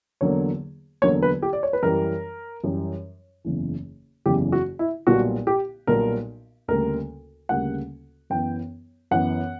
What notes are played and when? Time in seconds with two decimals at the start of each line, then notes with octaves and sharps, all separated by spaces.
0.21 E2 D3 F#3 A#3 C#5
1.02 E2 D3 F#3 A#3 C#5
1.23 B4
1.42 G4
1.53 D5
1.63 C#5
1.73 B4
1.83 F#2 E3 G3 A#4
2.64 F#2 E3 G3
3.45 F#1 E2 C#3 E3
4.26 F#1 E2 C#3 E3 G4
4.52 F#4
4.79 E4
5.07 B1 A#2 G3 B3 F#4
5.47 G4
5.87 B1 A#2 G3 B3 A#4
6.68 D2 C#3 G3 A#3 A#4
7.49 D2 C#3 G3 A#3 F#5
8.30 F#2 E3 B3 G5
9.11 F#2 E3 B3 F#5